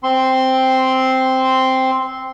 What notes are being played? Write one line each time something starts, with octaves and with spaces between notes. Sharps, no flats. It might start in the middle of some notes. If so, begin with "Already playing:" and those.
C4 C6